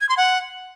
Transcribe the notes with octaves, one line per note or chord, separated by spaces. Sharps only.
G#6
C6
F#5